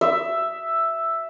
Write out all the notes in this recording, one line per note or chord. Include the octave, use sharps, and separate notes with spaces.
E5